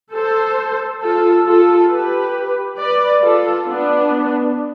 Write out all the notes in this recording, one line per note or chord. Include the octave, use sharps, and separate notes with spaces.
A4 C5
F4 A4
F4 A4
G4 B4
B4 D5
F4 A4
B3 D4